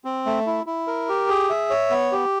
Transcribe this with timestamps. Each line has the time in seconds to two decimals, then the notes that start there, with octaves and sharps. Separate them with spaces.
0.05 C4
0.26 A3
0.47 E4
0.66 E4
0.87 A#4
1.09 G4
1.29 G#4
1.50 E5
1.70 C#5
1.90 B3
2.12 G4